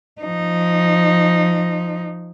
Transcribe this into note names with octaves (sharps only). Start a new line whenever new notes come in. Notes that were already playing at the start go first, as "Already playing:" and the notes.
F3 D#4